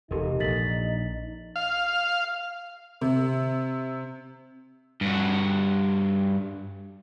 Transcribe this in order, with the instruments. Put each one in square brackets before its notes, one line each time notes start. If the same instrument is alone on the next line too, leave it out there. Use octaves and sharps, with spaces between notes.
[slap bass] E1 C3 [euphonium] D#4 [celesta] G4 A4 A#4
[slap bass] A#1 [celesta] A6 B6 F#7
[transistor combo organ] F5
[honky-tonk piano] C3
[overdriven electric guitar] G2 F#4